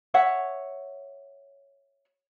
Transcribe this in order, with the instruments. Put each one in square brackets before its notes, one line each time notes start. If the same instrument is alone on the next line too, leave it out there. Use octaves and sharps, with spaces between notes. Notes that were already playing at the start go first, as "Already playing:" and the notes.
[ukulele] C#5 E5 F#5